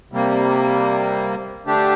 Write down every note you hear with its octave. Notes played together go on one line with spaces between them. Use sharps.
C3 G3 A#3
D3 A3 D4 G4